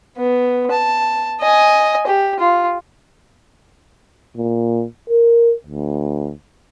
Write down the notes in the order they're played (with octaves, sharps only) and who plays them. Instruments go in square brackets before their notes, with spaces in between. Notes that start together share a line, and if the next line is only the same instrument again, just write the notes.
[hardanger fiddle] B3
A5
D#5 G#5
G4
F4
[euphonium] A#2
A#4
D2